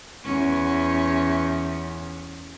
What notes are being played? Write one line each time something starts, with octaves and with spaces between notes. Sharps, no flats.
E2 C#4